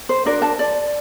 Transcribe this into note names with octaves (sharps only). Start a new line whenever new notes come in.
C5
D4 F#4 A#4 D5
A5
D5